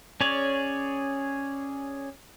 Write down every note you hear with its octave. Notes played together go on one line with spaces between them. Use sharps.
C#4 G#4 C#5 D5